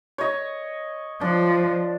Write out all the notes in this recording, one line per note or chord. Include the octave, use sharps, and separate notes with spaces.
C#5 D#5
F3 D4